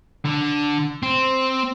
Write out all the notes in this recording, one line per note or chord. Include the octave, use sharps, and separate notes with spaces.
D3
C4